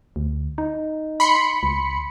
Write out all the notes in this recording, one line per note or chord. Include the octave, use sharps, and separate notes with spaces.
D2
D#4
B5 C6 C#7
C#2